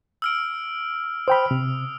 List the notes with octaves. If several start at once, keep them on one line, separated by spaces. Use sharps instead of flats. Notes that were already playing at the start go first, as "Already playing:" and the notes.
E6 F6 D7
C5 G5 B5 D#6 F6
C3